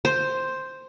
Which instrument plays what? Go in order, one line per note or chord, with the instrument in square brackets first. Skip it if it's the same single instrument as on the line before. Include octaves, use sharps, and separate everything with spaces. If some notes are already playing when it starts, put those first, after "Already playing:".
[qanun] C5